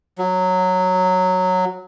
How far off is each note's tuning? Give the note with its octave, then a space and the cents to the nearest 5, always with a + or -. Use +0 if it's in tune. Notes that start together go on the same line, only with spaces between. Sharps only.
F#3 -10